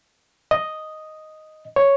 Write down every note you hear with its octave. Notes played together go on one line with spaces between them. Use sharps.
D#5
C#5